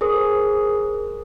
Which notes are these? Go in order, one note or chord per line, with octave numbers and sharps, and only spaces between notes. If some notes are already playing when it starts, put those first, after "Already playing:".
G#4 A#4 C5 D#6